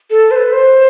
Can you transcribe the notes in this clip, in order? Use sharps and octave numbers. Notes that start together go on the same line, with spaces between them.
A4
C5
B4
C5